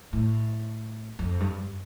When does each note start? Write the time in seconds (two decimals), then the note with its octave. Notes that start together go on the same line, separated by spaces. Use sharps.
0.13 A2
1.19 F2
1.40 G2